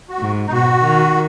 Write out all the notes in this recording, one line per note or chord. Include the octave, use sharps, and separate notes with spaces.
F#4
G#2
D#4
B2 F#4
D#3